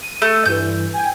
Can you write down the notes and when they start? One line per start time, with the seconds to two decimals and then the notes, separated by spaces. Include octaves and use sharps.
0.02 D#7
0.22 A3
0.45 G2 E3 G6
0.93 G5 G#5